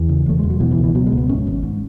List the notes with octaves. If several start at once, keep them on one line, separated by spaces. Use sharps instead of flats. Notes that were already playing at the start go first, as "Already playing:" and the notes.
Already playing: E2 E3
C#3
E1 A3
E1 G#3
F#3
B2 E3
E3
C#2
E3
B2 F#3
G#3
C#2
B3
G#2 C#4
G#1
G#2